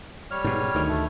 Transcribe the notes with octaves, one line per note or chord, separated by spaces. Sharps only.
G3 C#5 F6
G#2 B2
D2 D#3
A3